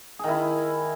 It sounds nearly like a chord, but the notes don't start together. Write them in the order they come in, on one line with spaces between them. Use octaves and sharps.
G#4 D#3 E4